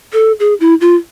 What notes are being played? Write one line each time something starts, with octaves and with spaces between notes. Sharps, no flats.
A4
G#4
E4
F4